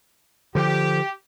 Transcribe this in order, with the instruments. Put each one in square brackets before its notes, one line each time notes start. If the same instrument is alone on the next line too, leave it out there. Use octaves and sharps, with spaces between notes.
[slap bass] D3 F3 [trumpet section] G4